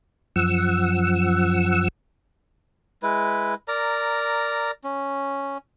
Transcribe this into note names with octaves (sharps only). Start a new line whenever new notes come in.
F#2 F3 F#5 E6
G#3 E4 B4
A#4 D5 A#5
C#4